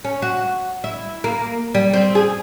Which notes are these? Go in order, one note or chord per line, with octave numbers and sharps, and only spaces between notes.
C#4
F#4
E4
A#3
G3
C4
G#4